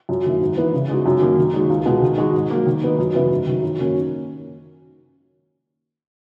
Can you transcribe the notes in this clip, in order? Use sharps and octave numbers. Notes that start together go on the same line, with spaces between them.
F#2
D#3 A#3 E4
G#2
E3 B3 E4
C#3
G#3 D#4 F#4
F#2
D#3 A#3
D#3
G#3 D#4 F#4
C#2
B2 G#3
D#3
G#3 D#4 F#4
G#2
F#3 A#3
D#3
F#3 B3 D#4
F#2
C#3 E3 B3 E4
G#2
D#3 F#3
F#2
D#3 A#3 C#4 F#4